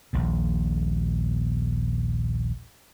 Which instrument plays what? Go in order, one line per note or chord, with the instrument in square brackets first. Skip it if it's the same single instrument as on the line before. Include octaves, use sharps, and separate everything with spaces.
[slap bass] D#1 A#1 A#2